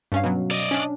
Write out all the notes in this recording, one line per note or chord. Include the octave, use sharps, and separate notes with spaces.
G2 C#4 F5
B2 F#3
D5 D#5
C#4 D4